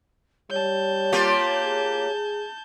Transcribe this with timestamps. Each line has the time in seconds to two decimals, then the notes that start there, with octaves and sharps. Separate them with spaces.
0.50 G3 C#5 A5 G6
1.12 A#3 F4 G4
1.63 G#4